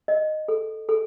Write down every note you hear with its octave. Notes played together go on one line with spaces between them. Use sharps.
D#5
A4
A4